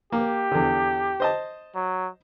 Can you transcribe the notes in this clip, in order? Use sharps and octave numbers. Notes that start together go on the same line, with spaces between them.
A#3 G4
E2 D3
C5 D#5 A5
F#3